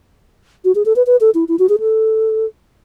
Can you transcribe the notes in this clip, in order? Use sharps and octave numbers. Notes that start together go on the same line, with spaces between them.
F#4
G#4
A4
B4
B4
A4
E4
E4
F#4
G#4
A4